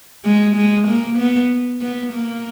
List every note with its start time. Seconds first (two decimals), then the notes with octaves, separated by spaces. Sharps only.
0.25 G#3
0.56 G#3
0.88 A#3
1.18 B3
1.81 B3
2.12 A#3